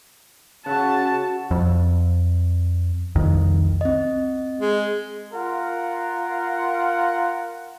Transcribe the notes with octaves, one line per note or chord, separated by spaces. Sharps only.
C#3 F#4 E5 F#5 A5
F2
C2 F2 D#3
C4 D#5
G#3
F4 A#4 F5 F#5